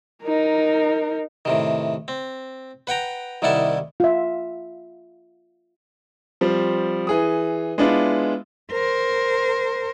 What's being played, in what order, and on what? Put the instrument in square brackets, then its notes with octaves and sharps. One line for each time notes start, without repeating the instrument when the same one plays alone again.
[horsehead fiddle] D#4 A#4
[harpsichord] A2 C3 D#3
C4
B4 F#5 G5 A#5
C2 D#3 G3 E4 F#5 A5
[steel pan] F4 E5
[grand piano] F3 G3 C4
E3 G#4 D#6
G#3 B3 D4 E4 F4
[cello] A#4 C5